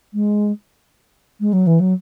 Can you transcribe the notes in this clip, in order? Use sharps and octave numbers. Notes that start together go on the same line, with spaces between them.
G#3
G#3
F#3
E3
F#3